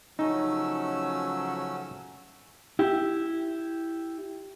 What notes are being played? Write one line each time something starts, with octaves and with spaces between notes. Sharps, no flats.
C#3 F3 F#3 A3 C#4 D#4 E6
E4 G4